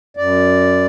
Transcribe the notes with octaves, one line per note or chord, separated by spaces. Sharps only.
F#2 D5